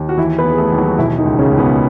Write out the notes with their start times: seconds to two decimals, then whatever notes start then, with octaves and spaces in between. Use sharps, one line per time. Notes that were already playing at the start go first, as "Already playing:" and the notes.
Already playing: D#2
0.09 F#4
0.17 E3 E4
0.38 B3 B4
0.44 D#2
0.51 G#4
0.58 A3 A4
0.72 D#2
0.78 F#3 F#4
0.98 B2 E3 E4
1.18 D#3 D#4
1.25 C#2
1.39 C#3 C#4
1.51 C#2
1.58 B2 B3